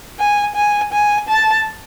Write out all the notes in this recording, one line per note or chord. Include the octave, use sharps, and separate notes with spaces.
G#5
G#5
G#5
A5